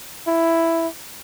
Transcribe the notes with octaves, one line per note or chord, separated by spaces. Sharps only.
E4